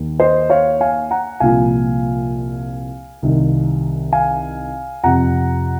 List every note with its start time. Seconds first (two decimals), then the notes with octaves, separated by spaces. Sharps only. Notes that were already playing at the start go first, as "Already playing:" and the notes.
Already playing: D#2 D#3
0.20 C5 D#5
0.50 C#5 F5
0.81 F5 G#5
1.11 F#5 A#5
1.40 C2 A#2 F3 F5 G#5
3.22 C2 C3 D#3
4.13 F5 G#5
5.04 F2 C3 F3 F#5 A#5